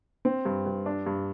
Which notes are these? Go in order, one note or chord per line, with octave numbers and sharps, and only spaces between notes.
C4
G2
G2
D4
G2